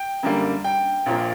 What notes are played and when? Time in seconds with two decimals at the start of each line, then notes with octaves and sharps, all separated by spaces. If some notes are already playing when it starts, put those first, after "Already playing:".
Already playing: G5
0.23 F#2 D3 G3 A#3
0.64 G5
1.06 A#1 A#2 F3 A#3